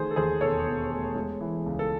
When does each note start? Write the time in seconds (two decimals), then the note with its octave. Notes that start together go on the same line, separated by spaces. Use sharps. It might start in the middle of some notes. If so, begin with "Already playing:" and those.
Already playing: D#3 A3 G#4 C5
0.11 A4
0.16 D#2 G#4 C5
0.41 E1 A4 C#5
0.67 E1
0.90 A3
1.15 G#3
1.40 E3
1.66 C#2
1.79 A4